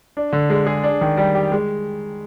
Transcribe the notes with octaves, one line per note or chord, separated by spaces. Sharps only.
D4
D3
G#3
G#4
D4
D#3
G3
G4
G#3